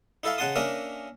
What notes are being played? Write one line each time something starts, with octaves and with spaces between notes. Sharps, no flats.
D#4 E4 A4 E5 F5
C#3 D#4 F#5 A5 C6 D#6
A#3 C#4 D4 A#4 D#5 E5